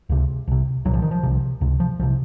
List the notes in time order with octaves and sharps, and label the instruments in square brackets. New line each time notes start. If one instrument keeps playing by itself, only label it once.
[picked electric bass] C#2 C3
C2 C3
C2 A#2 F#3
F3
D#3
F3
C2 C3
C#2 C3
F3
C2 F3
C3